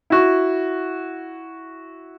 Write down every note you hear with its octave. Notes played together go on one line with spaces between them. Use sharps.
E4 F#4